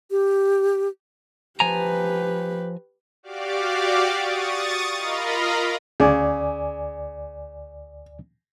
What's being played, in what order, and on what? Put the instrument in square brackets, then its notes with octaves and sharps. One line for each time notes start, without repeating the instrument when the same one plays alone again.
[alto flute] G4
[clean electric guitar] F3 G#5 A#5 [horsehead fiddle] G4 B4
[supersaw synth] F#4 G4 D5 F5 D6
C#6 D#6 A6
F4 A#4 D#5 F5 A#5 B5
[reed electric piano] D2 D5 G#5 [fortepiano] C#3